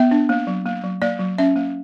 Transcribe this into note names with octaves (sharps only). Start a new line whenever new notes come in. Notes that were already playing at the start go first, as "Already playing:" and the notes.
Already playing: B3 E5
D4
A#3
F#3
A#3
F#3
A#3 D5
F#3
C#4 E5
A#3